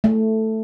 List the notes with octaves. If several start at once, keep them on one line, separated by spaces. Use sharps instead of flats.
A3